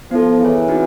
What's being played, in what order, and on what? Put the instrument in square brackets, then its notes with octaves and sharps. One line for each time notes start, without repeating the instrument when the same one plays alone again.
[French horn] F3 [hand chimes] B3 E4 A4
[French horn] E3 [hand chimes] E4 G#4 C#5
[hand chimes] C4 D#4 F#4